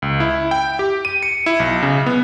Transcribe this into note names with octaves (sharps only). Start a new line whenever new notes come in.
C#2
E4
G5
G4
D#7
C#7
E4
B1
C#3
B3